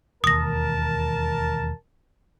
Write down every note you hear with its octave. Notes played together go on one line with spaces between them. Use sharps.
E1 D#2 A#4 A5 D#6 A#6